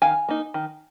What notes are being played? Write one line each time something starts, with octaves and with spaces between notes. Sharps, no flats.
D#3 F5 G#5
A#3 D#4
D#3